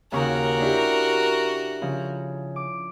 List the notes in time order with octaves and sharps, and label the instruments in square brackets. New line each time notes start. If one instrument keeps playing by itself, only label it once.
[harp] D#2 C#3 C#6 [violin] F#4 A#4
[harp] D4 E4 G4
C#3 F3
D6